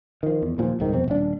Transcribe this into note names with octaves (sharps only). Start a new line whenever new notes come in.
D#3 F3
E2
D#2 A#2 F3
E1 C2 G#2 D#3
F2 B2 C4
D#1 D4